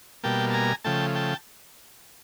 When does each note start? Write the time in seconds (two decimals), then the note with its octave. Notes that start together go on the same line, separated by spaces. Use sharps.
0.23 B2 G3 A#3 G5 A5
0.50 A5
0.54 G#5 A#5
0.84 C#3 F3 A3 G5 A5
1.15 G5 A5